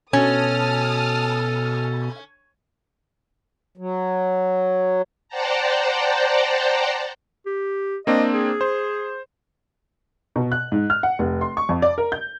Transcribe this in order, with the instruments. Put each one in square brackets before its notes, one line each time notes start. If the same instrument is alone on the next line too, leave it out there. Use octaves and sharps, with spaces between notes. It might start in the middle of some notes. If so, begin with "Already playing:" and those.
[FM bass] B2 [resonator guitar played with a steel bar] C#4 [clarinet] A4 [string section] A5 D#6 F6
[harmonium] F#3
[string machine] C5 D5 F#5 G5 A5 A#5
[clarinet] G4
[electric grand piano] A#3 C4 D4 [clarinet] D#5
[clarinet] G#4
[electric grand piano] C5
[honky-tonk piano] B2
F#6
G#2
F6
F#5
F1
C6
C#6
F2
D5
A#4
G6